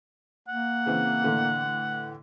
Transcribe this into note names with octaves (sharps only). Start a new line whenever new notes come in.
A#3 F#5
C#3 E3 C4
A2 D3 E3